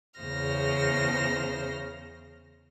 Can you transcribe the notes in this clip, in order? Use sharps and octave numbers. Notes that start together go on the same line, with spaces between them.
E2 C#3 C5 F6 A#6